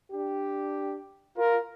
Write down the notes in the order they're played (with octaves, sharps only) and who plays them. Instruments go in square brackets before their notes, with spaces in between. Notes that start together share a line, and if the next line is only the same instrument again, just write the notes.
[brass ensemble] D4 G4
F4 A#4